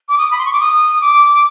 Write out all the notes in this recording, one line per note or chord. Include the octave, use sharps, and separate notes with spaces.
D6
D#6
B5
C6
C#6
D6
D#6
D6